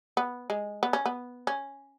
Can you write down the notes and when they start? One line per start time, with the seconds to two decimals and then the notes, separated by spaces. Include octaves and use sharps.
0.17 B3
0.50 G#3
0.83 B3
0.93 C#4
1.06 B3
1.47 C#4